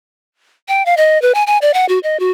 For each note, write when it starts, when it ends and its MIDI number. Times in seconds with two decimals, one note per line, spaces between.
0.68 0.83 79
0.86 0.95 77
0.97 1.20 75
1.22 1.32 71
1.35 1.43 80
1.47 1.58 80
1.62 1.74 74
1.74 1.86 78
1.89 1.99 66
2.03 2.19 75
2.20 2.32 66